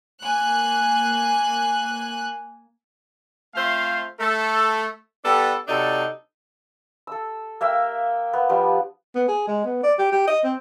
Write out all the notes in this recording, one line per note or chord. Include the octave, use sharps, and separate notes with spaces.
A#3 G#5 F#6
A3 C4 F4 C5 E5 F5
A3 A4
G3 B3 D4 A4
C3 F#3 D4 D#4 A4
A4 E6
A#3 E5 G5 E6
B3
F3 G3 B3 D4
B3
G#4
G#3
B3
D5
G4
G4
D#5
C4